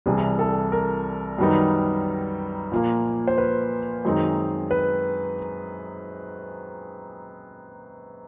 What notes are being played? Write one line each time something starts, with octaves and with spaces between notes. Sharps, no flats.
C2 C3 E3 G3 G#4
A4
A#4
F#2 D#3 G3 B3 D#4
A#2 F3 A#3
C5
B4
F#2 D#3 G#3 C4 D#4
B4